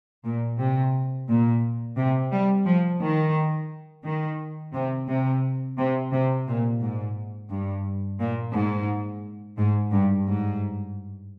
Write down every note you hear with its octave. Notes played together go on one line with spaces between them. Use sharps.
A#2
C3
A#2
C3
G3
F3
D#3
D#3
C3
C3
C3
C3
A#2
G#2
G2
A#2
G#2
G#2
G2
G#2